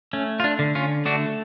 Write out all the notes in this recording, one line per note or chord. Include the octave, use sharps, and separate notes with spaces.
A3 C#4
F4
D4
D3
C#4 F4
A3 D4 F#4